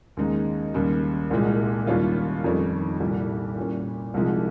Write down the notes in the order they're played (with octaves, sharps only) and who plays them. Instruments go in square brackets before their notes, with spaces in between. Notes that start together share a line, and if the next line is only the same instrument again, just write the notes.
[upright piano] D#2 C#3 G#3 D#4
D#2 C#3 G3
C2 A#2 G#3
D#2 C#3 G3 C#4 F4
F2 D#3 G3 C#4
C2 A#2 G3
A#2 G3 C#4
C2 C3 F3 G#3 D#4